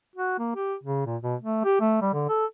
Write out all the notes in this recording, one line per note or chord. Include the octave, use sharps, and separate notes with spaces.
F#4
A#3
G4
C#3
A#2
B2
A3
G4
A3
G3
D3
A4